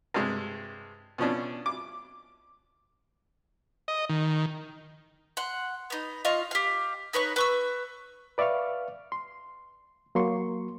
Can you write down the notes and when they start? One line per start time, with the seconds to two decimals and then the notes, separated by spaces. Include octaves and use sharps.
0.14 G2 C3 G#3
1.18 B2 F3 C#4 D4
1.66 D6
3.88 D#5
4.09 D#3
5.37 F#5 C6
5.90 B3 D#4
6.25 F4 D#5 F5 C#6
6.51 G4 F5
7.13 D#4 B4 C#5 C#6
7.36 B4 C#6 E6
8.38 B4 D5 E5 F5 C#6 F6
9.12 C6
10.15 F#3 A#3 C6 C#6